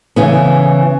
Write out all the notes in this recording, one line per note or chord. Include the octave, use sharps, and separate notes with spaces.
C#3 E3 B3